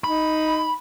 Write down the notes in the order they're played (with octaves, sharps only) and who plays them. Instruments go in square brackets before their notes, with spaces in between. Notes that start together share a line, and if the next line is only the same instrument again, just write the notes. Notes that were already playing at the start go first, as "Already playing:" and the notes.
[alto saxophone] D#4 [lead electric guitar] B5